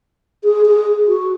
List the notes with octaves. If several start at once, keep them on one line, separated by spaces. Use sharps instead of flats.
G#4
G#4
F#4